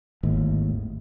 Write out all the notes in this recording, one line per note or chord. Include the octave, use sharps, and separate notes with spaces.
G#1 D#2 A2